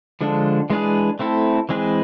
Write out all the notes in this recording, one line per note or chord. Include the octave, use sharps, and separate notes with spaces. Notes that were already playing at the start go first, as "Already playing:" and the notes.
D3 F3 G#3 D4 A4
E3 G#3 D4 G#4 B4
A3 C4 E4 A4
E3 G#3 C4 G#4 B4